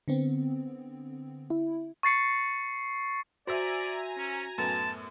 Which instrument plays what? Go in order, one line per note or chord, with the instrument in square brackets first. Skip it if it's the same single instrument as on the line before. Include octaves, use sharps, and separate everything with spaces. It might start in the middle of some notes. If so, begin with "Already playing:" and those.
[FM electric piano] D3 B3 C4
E4
[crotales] C#6 A6 C7 C#7
[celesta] F#4 [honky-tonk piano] C5 E5 [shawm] D5 [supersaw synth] G#5 A#5
[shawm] C#4
[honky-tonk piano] F#2 A2 B3 [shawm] A5